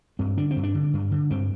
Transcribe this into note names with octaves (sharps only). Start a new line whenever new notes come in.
G2 C4
D3 D4
C4
G2
D4
D3
G2
D3
G2 C4